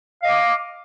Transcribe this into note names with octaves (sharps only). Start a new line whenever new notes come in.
D#5 F5 D6